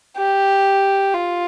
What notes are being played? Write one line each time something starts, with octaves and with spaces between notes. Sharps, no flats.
G4
F4